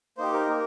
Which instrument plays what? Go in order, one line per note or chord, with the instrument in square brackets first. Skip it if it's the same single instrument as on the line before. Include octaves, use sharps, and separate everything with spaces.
[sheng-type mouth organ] A#3 D#4 G4 C5
A#4
A#3